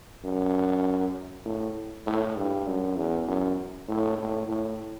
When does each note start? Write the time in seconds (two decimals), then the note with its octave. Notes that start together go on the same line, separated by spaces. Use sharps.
0.24 F#2
1.45 A2
2.06 A2
2.36 G2
2.66 F#2
2.96 E2
3.27 F#2
3.88 A2
4.17 A2
4.48 A2